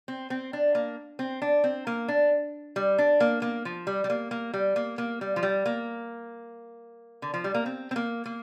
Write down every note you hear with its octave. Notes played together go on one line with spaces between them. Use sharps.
C4
C4
D4
A#3
C4
D4
C4
A#3
D4
G3
D4
A#3
A#3
F3
G3
G3
A#3
A#3
G3
A#3
A#3
G3
F3
G3
A#3
D3
F3
G3
A#3
C4
C4
A#3
A#3